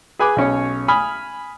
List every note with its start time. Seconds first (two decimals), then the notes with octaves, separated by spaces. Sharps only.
0.19 G#4 B4 G#5 B5 D6
0.36 B1 C#4 C#5
0.88 G#5 B5 D#6 F6